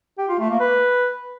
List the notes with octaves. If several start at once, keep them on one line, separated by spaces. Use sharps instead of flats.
G4
F4
A3
A#3
B4